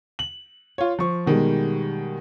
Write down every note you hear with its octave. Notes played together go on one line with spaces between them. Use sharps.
F#7
F4 C#5
F3 C#6
B2 D#3 G3 G#3